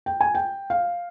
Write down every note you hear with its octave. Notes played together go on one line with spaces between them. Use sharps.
G5
G#5
G5
F5